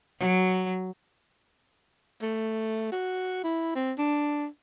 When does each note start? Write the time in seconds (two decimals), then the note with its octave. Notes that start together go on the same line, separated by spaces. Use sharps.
0.19 F#3
2.22 A3
2.92 F#4
3.44 E4
3.75 C4
3.99 D4